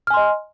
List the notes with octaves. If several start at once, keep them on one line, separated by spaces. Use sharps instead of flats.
D#5 G#5 C6 F6